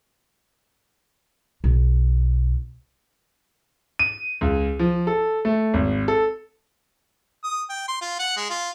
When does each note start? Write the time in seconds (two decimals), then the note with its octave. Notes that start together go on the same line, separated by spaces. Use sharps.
1.64 B1
3.99 D#7
4.41 C#2
4.79 F3
5.07 A4
5.45 A3
5.74 G#1
6.08 A4
7.44 D#6
7.70 G5
7.88 C6
8.01 F4
8.19 F#5
8.37 G#3
8.50 F4